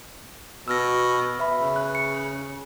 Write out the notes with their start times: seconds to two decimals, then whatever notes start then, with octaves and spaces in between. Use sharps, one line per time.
0.68 B2 E6 F6 A#6
1.39 B4 E5 B5
1.58 C#3
1.76 F#6
1.95 C#7